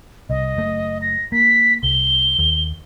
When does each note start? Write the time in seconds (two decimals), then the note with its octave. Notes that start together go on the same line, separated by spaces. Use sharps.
0.30 C2 D#5
0.57 F#1 A3
1.02 A#6
1.32 A#3 B6
1.83 C2 G7
2.39 D#2